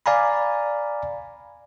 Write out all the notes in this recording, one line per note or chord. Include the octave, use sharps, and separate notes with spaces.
D5 F5 G#5 A#5 B5